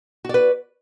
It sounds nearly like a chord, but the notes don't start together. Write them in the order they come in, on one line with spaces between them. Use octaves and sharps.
F#4 D5 B4